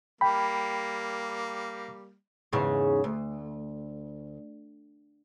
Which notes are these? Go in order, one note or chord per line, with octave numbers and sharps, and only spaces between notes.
G3 A#3 G5 B5
E2 G#2 C#3
D2